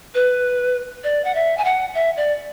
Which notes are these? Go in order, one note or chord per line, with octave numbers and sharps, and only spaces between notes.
B4
D5
F#5
E5
G#5
F#5
E5
D5